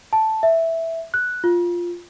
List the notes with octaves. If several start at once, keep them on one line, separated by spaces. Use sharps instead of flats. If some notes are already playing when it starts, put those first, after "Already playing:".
A5
E5
F#6
F4